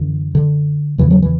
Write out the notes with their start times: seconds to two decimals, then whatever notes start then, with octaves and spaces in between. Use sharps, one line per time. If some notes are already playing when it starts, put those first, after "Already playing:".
Already playing: F#2 D3 E3
0.35 D3
0.98 E2 C#3 E3
1.11 F#3
1.22 E3